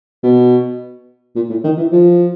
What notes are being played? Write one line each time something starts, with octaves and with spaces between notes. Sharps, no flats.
B2
A#2
A2
D#3
E3
F3